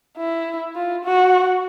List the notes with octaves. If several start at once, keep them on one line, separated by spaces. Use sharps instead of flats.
E4
F4
F#4